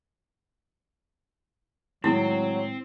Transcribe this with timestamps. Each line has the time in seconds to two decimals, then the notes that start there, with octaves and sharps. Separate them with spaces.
2.04 A2 D#3 F#3 G#3 C4 E4